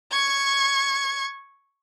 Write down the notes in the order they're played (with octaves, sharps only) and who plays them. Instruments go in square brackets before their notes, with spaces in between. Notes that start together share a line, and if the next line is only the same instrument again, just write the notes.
[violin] C#6 G#6